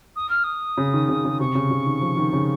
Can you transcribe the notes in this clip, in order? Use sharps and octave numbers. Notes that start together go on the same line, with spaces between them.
D#6
F6
D#6
C#3
D#3
C#3
C#3
C3 C#6
C#3
C#3
D#3
F3
D#3
C#3